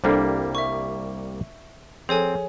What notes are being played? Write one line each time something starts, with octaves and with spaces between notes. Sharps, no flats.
C2 G3 A#3 D4 A4 C5
E5 C#6
F3 C4 G#4 A4 C#5 G#5